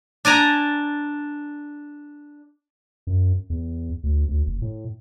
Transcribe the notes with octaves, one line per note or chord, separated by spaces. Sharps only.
D4 D5 G#5 A#5
F#2
E2
D2
D2
F#1
A2